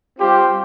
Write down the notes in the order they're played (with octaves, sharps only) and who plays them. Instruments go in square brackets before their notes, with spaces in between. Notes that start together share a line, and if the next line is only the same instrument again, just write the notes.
[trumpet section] G3 C4 F4 G4 C5